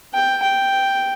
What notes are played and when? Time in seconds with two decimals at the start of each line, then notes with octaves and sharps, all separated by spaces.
0.14 G5
0.42 G5